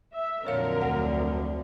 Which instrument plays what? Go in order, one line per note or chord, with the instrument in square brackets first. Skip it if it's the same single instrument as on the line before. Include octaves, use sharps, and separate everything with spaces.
[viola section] E5
[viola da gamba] F2 D3 F#3 [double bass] A#2 [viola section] A#4 [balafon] C#5 F5
[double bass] D2 [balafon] F#5